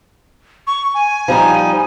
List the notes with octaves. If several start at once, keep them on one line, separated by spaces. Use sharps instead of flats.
C#6
G#5
F3 G3 D#4